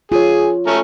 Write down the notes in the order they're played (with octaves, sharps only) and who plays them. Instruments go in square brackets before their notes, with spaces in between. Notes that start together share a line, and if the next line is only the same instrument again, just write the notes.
[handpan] F4 C#5 [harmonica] G#4
[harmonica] A3 C#4 A#5